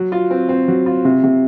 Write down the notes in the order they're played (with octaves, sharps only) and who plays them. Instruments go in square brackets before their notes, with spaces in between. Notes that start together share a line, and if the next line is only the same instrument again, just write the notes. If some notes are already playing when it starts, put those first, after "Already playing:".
Already playing: [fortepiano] F#3
F4
C4
C4
F#3
F4
C3
C3